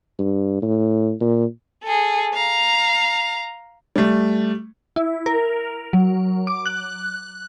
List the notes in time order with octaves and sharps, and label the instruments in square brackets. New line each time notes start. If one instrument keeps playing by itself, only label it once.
[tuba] G2
A2
A#2
[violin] G#4 A4
F5 A#5
[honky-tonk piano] G3 A3
[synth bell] E4
A#4
F#3
D6
F#6